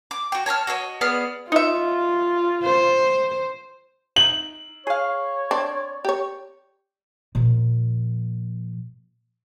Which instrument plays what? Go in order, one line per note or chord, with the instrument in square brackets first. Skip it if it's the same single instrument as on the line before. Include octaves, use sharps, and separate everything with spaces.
[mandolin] D6
F#4 G5
C#5 A5 A#5 F6
F#4 A4 C#5 D#5
B3 G#4 D5 F6
[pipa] D#4 E5 [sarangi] F4
[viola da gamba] C5
[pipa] D#4 [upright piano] F#7
[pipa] G#4 F5 [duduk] C#5
[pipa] C4 D5 [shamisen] D4
[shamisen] G4 C#5
[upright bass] A#2 F3